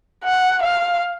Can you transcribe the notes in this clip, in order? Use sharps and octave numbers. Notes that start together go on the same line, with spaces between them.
F#5
F5